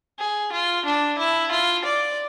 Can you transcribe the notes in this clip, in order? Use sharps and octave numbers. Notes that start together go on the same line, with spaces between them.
G#4
F4
D4
E4
F4
D5